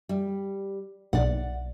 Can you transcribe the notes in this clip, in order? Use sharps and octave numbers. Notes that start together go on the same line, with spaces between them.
G3
B1 D5 F#5